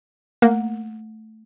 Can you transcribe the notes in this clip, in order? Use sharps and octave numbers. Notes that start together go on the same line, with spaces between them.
A3 A#3